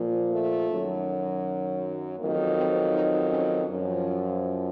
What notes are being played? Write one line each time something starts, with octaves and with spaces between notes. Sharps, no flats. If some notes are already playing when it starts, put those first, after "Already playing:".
Already playing: A#2 F3
A3
F#2 D#3 F#3
F2 D#3 F#3 A#3
C4
D#4
C#4
F#2 F3